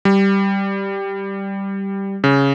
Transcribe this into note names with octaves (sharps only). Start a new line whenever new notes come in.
G3
C#3